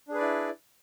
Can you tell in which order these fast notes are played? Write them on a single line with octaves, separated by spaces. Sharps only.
D4 G#4 B4 D5 E4